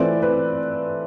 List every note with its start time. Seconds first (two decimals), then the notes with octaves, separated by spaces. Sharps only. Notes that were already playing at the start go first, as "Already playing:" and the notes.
Already playing: E3 A3 C4 F4 B4 D5
0.22 B4